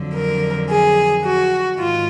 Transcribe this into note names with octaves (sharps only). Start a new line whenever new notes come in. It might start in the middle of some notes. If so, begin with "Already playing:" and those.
Already playing: F2 D3 F#3
A#4
G#4
F#4
G#2 D#3 F4